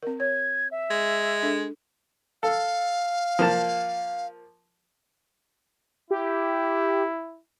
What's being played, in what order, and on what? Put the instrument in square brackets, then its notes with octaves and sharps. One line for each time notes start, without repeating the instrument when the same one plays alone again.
[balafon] C4 A#4
[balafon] C#5 [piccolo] G#6
[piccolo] E5
[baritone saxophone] G#3
[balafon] D4 A4
[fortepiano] A4 [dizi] F5
[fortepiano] F3 A#3 A5
[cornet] E4 [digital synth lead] G4